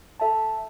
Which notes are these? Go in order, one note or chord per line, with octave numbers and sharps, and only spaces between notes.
A4 E5 A5